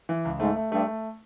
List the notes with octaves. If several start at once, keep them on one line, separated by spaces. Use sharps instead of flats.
E3
C#2
G#2 A3
A3
G2 A3
A3